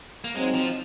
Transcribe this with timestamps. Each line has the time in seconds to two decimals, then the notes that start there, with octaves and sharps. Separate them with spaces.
0.24 A#3
0.35 F#3 G#3 C4 D#4
0.54 F3